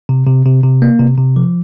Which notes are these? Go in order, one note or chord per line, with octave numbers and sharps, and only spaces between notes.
C3
C3
C3
C3
A#3
C3
C3
F3